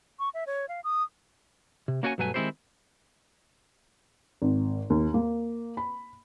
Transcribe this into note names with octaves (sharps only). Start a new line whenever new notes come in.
C#6
E5
C#5
F5
D#6
C3
A#3 C#4 F#4 C#5 D5 G#5
B1 G2 F#3 A3 B4 G#5
D#3 G#3 C4 E4 G4 C5
G#1
D#2
A#3
B5